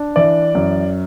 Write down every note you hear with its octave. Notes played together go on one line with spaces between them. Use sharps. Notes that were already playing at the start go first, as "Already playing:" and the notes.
Already playing: D4
E3 D5
F#2